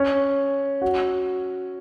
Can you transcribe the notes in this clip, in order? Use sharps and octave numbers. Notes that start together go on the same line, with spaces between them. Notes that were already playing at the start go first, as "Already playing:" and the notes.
Already playing: C#4
F#4